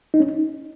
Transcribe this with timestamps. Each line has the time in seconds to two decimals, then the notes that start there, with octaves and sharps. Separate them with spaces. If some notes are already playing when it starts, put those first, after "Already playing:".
0.14 D#4
0.20 C#4